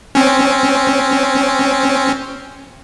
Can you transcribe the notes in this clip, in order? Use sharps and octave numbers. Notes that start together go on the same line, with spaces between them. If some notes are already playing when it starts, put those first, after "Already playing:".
C4 C#4